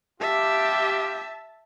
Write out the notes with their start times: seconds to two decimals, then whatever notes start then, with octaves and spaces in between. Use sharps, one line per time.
0.21 F4 G4 E5 A5